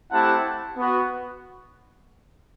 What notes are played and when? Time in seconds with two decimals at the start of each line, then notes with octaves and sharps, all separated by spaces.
0.11 A3 C4 E4 G4 F#5 A5
0.77 B3 F#4